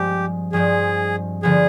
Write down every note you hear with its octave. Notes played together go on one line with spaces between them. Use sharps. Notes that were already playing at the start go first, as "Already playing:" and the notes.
Already playing: G2 F3 G#3 C4 G4
G2 F3 G#3 C4 G#4
D3 F3 B3 G#4